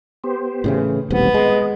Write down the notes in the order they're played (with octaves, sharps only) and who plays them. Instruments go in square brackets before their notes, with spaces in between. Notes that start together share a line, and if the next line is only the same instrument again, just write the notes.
[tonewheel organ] B3 G4 C5
[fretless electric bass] A2 C#3 E3
[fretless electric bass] D#1 A1 [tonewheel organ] B2 G3 C4 [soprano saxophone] B3
[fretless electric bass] G#3 [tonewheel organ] D#5